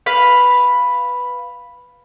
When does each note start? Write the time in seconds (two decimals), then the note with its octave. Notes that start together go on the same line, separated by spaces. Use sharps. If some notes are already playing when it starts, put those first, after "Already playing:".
0.06 B4 F5 B5